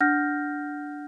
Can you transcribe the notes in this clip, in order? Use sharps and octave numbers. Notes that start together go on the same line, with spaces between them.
D4 F#5 F6 G6 A#6